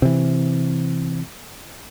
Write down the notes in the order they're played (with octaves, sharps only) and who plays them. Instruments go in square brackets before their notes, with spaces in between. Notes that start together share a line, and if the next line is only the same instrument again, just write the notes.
[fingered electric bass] C3 E3